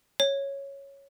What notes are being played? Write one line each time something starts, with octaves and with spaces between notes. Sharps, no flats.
C#5